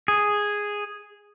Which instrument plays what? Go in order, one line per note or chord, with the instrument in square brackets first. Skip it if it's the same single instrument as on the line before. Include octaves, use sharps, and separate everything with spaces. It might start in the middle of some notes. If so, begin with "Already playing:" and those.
[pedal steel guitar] G#4